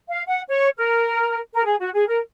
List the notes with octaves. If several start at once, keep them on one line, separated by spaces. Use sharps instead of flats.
F5
F#5
C#5
A#4
A#4
G#4
F#4
G#4
A#4